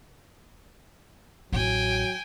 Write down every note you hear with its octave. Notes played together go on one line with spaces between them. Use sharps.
A1 F#3 E4 G5 G#5